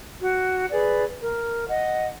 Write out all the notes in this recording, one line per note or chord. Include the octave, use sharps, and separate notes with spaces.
F#4
G#4 B4 D5
A#4
D#5 F#5